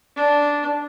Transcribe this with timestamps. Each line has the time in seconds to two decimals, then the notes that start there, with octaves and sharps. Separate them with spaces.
0.16 D4